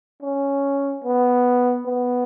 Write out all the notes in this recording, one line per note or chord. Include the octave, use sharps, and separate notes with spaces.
C#4
B3
B3